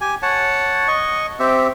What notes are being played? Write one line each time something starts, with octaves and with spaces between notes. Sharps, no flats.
G4 G#5
C#5 F#5 A5
D#5 C#6
C4 G4 E5